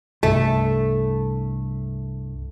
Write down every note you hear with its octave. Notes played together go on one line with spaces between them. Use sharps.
C2 G2 A3